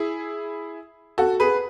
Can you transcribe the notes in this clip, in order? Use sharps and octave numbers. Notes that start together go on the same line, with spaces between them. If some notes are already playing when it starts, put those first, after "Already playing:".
Already playing: E4 G#4
F#4 A4
G#4 B4